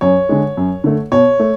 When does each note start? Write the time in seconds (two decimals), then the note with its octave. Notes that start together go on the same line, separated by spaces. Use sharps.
0.01 F#2 C#5
0.29 D3 G#3
0.57 F#2
0.84 D3 A3
1.12 B2 C#5
1.39 A3